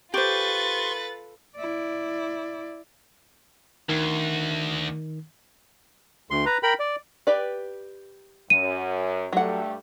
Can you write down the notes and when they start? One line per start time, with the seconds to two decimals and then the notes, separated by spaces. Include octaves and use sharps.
0.14 F4 G4 A4 B4 C5 C6 C#6 A6
1.56 E4 D5
3.89 D2 D#3
6.31 D2 C6
6.46 B4 A#5
6.63 A#4 G5 B5
6.79 D5
7.27 G4 B4 D5
8.50 F#2 D#7
9.33 G2 F#3 G3 A3 F#5